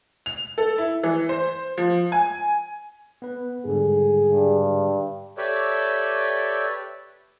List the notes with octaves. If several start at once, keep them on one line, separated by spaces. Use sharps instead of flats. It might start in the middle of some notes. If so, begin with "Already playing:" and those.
F7
A4
E4
E3
C5
F3
G#5
B3 B4
G#2 D3 G3 G#4
G2
G4 A4 B4 C#5 D5 E5